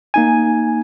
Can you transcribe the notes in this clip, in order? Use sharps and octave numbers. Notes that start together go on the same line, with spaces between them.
A#3 D#4 G#5